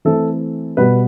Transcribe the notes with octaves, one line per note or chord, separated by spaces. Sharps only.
E3 A3 C4 A4
B2 G3 B3 B4